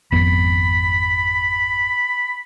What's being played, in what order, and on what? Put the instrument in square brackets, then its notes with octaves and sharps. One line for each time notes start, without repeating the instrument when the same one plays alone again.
[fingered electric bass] G#1 F2 B3 [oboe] B5